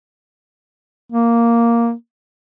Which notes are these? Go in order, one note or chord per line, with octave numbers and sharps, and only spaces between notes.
A#3